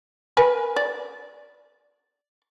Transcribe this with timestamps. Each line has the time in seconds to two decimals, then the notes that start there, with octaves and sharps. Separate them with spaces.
0.37 A#4 B4 G#5
0.76 D5